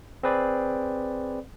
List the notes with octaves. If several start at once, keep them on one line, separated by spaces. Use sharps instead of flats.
C4 G#4 B4 D5